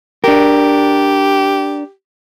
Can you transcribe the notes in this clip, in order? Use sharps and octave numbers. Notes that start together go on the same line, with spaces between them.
D4 G4 A#4